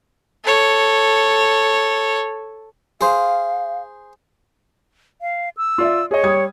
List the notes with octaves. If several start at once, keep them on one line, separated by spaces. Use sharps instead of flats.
A4 C#5
G#4 C5 F5
F5
E6
F4 D5 E5
G#4 C#5 D#5
G3 D#6 G#6